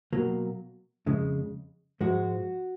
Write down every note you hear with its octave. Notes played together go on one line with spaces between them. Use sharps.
B2 F#3 A#3
F2 C#3 G#3
G#2 F3 G#3 F#4